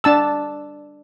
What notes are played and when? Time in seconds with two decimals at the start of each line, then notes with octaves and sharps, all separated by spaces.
0.04 D4 A5 E6